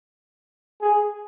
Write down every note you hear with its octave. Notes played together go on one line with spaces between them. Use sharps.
G#4